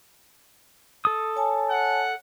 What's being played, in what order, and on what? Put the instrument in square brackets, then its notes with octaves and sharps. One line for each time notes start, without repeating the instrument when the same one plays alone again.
[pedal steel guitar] A4 D#6
[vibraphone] C#5 G#5 A5
[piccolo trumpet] F#5